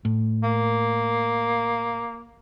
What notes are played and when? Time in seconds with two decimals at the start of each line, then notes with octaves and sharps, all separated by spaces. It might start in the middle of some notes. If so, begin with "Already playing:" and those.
0.05 A2
0.43 A#3